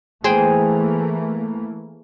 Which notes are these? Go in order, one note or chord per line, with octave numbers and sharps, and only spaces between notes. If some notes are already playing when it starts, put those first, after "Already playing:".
E3 A3 A#3 G#4 C5 G5